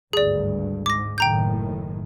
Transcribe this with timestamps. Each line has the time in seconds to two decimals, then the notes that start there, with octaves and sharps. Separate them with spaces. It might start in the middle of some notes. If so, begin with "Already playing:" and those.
0.13 G#1 D2 G2 G#4 D5
0.86 G#2 D6 A#6
1.18 F#1 A2 D#3 G5 A#5 G6